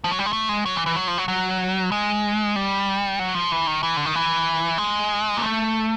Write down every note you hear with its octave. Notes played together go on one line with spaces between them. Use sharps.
F3
F#3
G3
G#3
A3
G#3
F#3
E3
E3
F#3
F3
F#3
F#3
G#3
G3
F#3
F3
E3
D#3
E3
D3
D#3
E3
G#3
A#3
A3